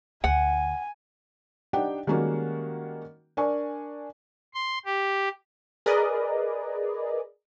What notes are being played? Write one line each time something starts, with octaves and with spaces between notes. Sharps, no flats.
D2 F#5 G#5
D4 D#4 G4 F#5 G5
D#3 G3 G#3 A#3 C#4 F#4
D4 A#4 D5 G#5 C#6
C6
G4
G#4 A#4 B4 D5 D#5